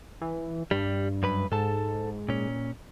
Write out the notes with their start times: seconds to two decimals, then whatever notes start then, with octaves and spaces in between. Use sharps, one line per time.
0.21 E3
0.71 G2 G3
1.23 F#2 B4 B5
1.52 G#2 A4 A5
2.29 A#2 C#4